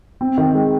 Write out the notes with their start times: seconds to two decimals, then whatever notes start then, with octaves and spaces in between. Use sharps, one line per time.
0.21 C4
0.38 D#3
0.55 G#3